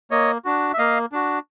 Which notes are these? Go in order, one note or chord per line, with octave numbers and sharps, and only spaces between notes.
A#3 C#5 D#5
D4 F#4
E5
A#3 D#5 F5
D4 F#4